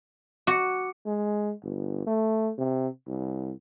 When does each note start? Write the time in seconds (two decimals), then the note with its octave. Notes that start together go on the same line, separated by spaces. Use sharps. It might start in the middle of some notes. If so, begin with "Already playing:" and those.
0.47 F#4 D6 C#7
1.06 G#3
1.63 G1
2.07 A3
2.58 C3
3.07 C2